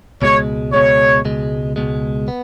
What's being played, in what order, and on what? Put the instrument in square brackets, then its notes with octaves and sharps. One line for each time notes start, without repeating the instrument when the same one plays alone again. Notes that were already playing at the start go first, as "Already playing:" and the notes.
[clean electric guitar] C#2 B2 G#3 [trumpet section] C#5
[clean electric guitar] C#2 B2 G#3 [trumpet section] C#5
[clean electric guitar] C#2 B2 G#3
C#2 B2 G#3
B3